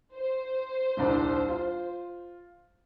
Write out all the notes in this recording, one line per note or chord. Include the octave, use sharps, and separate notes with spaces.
C5
D#1 C2 D4
F4